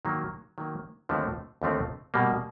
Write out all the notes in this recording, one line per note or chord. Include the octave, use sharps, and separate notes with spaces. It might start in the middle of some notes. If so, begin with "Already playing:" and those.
D#3 F#3 A#3
D#3 F#3 A#3
D#2 D3 F3 A3 C4
D#2 D3 F3 A3 C4
B2 G3 A#3